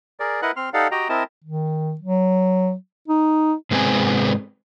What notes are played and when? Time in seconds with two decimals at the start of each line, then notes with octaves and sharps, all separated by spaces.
0.20 G#4 A#4 D5
0.42 E4 A#4 B4 D#5 F#5 F#6
0.56 C4 C6 F6
0.74 D#4 G4 A4 D5 F5 F#5
0.91 F#4 G4 D#5 G5 A#5
1.09 C4 E4 A#4 D#5 A5
1.44 D#3
2.01 F#3
3.08 D#4
3.71 G#2 C3 G#3 B3 C4 G#5